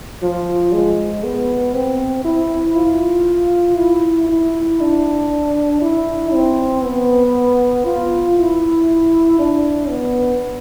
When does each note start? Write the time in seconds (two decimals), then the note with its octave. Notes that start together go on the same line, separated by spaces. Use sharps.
0.22 F3
0.72 G#3
1.24 B3
1.74 C4
2.25 E4
2.76 F4
3.77 E4
4.29 E4
4.81 D4
5.81 E4
6.33 C4
6.84 B3
7.85 F4
8.37 E4
9.39 D4
9.90 B3